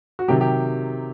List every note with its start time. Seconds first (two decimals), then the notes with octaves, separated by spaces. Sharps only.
0.19 F#4
0.28 C3 D#3 F#3 G4
0.41 G4